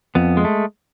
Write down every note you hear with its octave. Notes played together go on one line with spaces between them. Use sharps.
F2 B3
G#3
A3